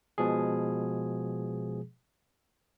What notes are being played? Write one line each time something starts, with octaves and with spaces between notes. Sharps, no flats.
B2 F3 G#3 G#4